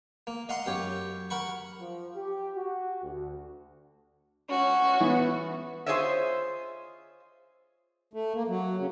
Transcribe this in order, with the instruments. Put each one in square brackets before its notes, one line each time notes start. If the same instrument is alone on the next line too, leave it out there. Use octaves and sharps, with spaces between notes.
[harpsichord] A#3
D#5 F5 F#5 A#5 C6
F#2 G4 C#5
A#4 F#5 B5 C#6
[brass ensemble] F3
G4
F#4
D2
[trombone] C#4 [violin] F#4
[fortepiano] E3 [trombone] B3
[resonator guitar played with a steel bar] F4 G#4 C5 C#5 D#5 E5
[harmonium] A3
A#3
F#3
C#3